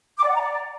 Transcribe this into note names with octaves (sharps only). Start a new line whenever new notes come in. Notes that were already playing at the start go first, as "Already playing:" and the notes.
D6
D5
F#5
A#5
D5